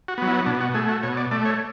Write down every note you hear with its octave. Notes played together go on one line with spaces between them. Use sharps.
F#4
F#3 B3
E4
B2 D4
F#4
A3 G#4
F#4
B2 C#5
D5
A3 D5
C#5